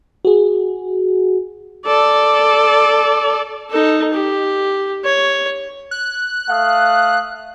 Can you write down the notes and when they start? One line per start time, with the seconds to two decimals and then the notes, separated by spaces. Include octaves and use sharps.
0.25 F#4 G#4
1.86 A4 D5
3.70 D#4 A4
4.13 G4
5.04 C#5
5.91 F#6
6.50 A3 F5 D#6